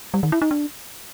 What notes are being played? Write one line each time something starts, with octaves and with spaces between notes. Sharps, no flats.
G3
D#3
E4
D#4
D4